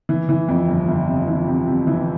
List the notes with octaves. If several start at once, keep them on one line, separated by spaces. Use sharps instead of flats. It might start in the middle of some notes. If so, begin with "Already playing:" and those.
E3
E3
F2
G1
G1
C3
E3
C3
C3
E3